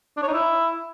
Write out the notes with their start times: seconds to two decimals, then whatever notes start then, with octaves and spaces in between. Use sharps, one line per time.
0.17 D4
0.22 C#5
0.28 D#4
0.34 E4